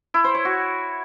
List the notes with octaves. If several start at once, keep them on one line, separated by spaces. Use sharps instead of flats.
E4
C5
C#5
F#4